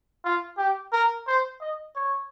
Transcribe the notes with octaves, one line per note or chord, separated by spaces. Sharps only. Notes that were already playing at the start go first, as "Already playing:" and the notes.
F4
G4
A#4
C5
D#5
C#5